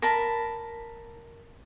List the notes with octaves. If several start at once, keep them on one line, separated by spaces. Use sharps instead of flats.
A#4 A5 B5